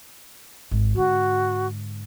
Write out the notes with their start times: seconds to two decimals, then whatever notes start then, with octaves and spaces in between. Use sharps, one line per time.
0.71 G#1
0.95 G#2 D3 F#4